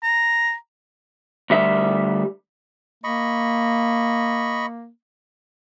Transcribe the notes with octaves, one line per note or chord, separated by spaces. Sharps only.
A#5
D2 G3 E5
A#3 D#5 B5 C#6